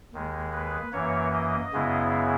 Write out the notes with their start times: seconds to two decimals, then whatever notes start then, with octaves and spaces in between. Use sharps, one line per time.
0.13 D#2 D#3 G#3
0.53 B4
0.92 F#2 E3 A#3 C#5
1.33 D#5
1.73 F#2 C#3 G#3 B3 E4